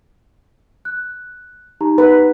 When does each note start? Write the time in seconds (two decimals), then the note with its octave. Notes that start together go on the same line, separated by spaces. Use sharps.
0.85 F#6
1.81 D#4 G4 A#5
1.98 B4